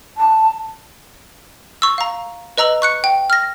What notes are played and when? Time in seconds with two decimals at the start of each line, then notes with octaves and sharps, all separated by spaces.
0.17 A5
1.82 C#6 E6
1.98 F5 A#5
2.58 B4 D#5 A#5 E6 F#7
2.82 C#6 F#6 C#7
3.04 G5
3.30 F6 A#6